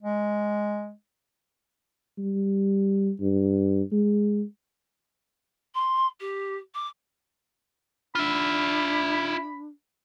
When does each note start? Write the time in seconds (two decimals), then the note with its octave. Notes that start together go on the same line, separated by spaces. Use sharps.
0.03 G#3
2.18 G3
3.21 G2
3.92 G#3
5.74 C6
6.20 G4
6.75 D6
8.15 D4 F4 E5 B5